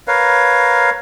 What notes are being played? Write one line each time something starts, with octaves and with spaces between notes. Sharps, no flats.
A#4 B4 C#5 F5